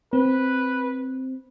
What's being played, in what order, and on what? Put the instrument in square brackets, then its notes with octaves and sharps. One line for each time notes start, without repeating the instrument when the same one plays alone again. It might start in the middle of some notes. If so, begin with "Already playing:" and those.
[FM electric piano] C4 [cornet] B4